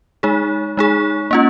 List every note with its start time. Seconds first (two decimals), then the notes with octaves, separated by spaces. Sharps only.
0.23 G#3 D#4 G#4
0.77 G#3 D#4 G#4
1.31 A#3 C#4 F4